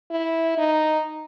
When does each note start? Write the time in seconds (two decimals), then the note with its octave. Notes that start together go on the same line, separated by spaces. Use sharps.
0.11 E4
0.58 D#4